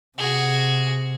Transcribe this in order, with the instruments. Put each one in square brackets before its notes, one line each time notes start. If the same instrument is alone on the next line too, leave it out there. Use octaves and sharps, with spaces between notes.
[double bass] C3 [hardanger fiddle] F#4 G#4